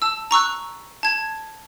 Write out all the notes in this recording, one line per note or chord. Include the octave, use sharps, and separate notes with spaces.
A5 E6
A#5 C#6 E6 F#6
A5 G#6